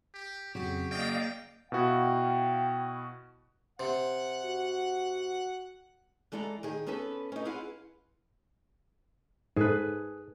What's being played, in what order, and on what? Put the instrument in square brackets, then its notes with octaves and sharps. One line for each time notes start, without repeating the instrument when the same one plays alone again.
[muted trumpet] G4
[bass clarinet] F2 [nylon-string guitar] C#3 F#3 F#4 [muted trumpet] G4
[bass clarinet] A#3 [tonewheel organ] D5 D#5 F5 [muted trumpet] G5
[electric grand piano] B2 E4 F#4 [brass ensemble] F5 G5
[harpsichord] C3 [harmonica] F#5
[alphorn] F#4
[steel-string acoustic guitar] E3 G#3 A4 D5 F#5 A#5
D#3 G#4 G5
B3 C#4 D4 A4 B4
C#4 D#4
E4 F4 G#4 B4 F5 F#5
[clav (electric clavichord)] G#2 [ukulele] G#4 A4 B4